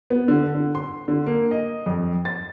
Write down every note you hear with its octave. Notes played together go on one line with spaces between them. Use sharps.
B3
D3
D3
C6
D3
A#3
D#5
F2
A6